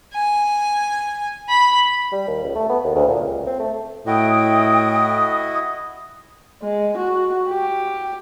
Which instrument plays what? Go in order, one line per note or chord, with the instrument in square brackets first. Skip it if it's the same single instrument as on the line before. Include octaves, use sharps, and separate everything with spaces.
[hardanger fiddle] G#5
B5
[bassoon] G3
D#2
C#2
A3
B3
D#2
D2
A#2
C#2
C4
A3
[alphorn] A2 [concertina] E4 F#4 D#5 [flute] G5 [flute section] D#6
[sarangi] G#3
F#4
G4